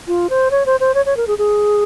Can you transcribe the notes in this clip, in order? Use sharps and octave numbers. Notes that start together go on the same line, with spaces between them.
F4
C5
C#5
C5
C5
C#5
C#5
A#4
G#4
G#4